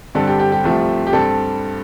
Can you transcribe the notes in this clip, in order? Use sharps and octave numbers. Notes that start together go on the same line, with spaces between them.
G2 D3 G3 C4 A4
G4
G4
G4
C2 C3 F3 A3 C4
G4
G2 G3 C4 A4